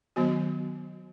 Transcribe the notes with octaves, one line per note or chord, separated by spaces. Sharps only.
D#3 F#3 B3 F#4